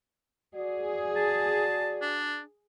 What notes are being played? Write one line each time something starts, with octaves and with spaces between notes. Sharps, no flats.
F#4 G#4 D5
A5
D4